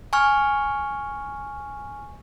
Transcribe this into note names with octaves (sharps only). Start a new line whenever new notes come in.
G#5 C#6 F6